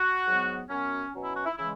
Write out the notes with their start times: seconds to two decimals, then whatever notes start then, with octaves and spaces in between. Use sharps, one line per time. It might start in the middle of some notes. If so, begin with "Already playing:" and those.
Already playing: F#4
0.27 G#2 F#3 B3
0.69 F#2 F#3 B3 C#4
1.13 B2 F#3 C#4
1.24 E4
1.35 F#4
1.46 E4
1.57 C#3 E3 G#3 E4